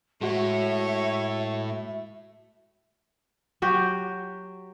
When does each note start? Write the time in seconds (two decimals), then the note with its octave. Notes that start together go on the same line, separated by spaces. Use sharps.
0.21 A2 G#3 F#4 C#5 E5
3.62 F#3 F#4 G4